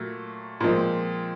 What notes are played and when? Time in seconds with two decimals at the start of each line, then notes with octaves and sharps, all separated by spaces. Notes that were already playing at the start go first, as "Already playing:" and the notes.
Already playing: A#2 F#3 A3
0.61 A#2 F3 G#3 C4